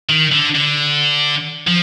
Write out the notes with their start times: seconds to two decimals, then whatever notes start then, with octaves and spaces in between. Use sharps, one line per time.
0.09 D#3
0.32 D3
0.55 D3
1.67 F3